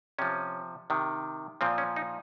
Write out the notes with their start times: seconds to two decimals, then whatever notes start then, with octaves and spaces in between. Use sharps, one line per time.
0.19 C3 F3 C#4
0.90 C3 D#3
1.61 A#2 F3 C4
1.78 C#4
1.96 D#4